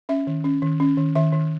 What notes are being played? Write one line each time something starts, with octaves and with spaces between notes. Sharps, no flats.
C#4 E5
D#3
C#4
D#3
C#4
D#3
D#3 E5
D#3